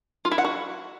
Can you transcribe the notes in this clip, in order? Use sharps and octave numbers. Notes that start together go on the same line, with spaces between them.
F4
E4
F#5
F#4